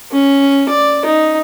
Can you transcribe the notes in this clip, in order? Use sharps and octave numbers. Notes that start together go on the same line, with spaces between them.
C#4
D5
D#4